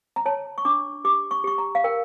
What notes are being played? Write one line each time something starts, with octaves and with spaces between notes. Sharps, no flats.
A#5
C#5 A5
C#6
D4 D6
G4 D6
C#6
G4 C#6
A#5
F5
A#4 G5